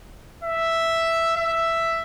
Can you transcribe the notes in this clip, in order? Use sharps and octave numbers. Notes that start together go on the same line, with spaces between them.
E5
E5